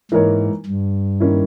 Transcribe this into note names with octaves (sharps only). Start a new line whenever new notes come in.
G#2 E3 A#3 D#4 A#4 C#5
G2
D#3 A#3 C#4 E4